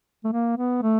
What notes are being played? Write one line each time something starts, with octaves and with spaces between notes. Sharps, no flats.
A3
A#3
B3
A3